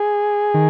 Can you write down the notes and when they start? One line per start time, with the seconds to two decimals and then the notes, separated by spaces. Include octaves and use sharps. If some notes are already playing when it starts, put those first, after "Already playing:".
Already playing: G#4
0.54 D#3